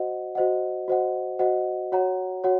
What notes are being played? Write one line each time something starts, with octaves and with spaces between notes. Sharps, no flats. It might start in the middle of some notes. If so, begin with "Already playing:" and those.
Already playing: F#4 C5 D#5 F#5
F#4 C5 D#5 F#5
F#4 C5 D#5 F#5
F#4 C5 D#5 F#5
F#4 C#5 F#5 A#5
F#4 C#5 F#5